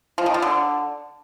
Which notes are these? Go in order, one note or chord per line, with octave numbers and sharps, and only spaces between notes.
F3
D#3
F3
D3